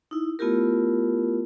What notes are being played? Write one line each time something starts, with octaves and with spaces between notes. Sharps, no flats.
D#4 E4
A3 B3 E4 F4 G4 A#4